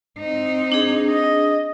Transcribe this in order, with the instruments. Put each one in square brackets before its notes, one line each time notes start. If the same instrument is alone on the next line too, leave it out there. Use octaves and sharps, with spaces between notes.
[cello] C4 D#4
[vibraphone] D4 G#4
[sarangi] D#5